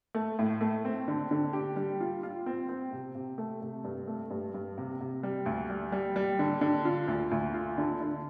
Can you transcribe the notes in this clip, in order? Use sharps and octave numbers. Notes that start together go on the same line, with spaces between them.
A3
A2
A3
C4
D3
D3
G4
G3
F4
F4
C4
C4
C3
C3
A3
C3
G2
A3
G2
G2
C3
C3
G3
D2
G3
G3
G3
D3
D3
F4
D2
D2
F4
D3
D3